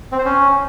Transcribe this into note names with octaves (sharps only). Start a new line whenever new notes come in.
C4
C5
C#4